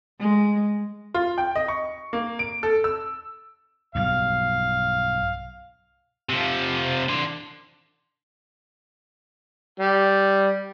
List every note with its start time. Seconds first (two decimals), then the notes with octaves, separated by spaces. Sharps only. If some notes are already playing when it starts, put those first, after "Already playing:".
0.20 G#3
1.14 F4
1.38 G5
1.56 D#5
1.68 C#6
2.13 A#3
2.39 D7
2.63 A4
2.84 E6
3.95 B1 G2 F5
6.29 C3 F3
7.09 D4 C6
9.80 G3